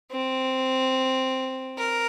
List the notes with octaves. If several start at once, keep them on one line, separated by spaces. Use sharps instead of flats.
C4
A#4